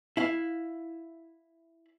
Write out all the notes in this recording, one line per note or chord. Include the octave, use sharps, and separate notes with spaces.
E4 F5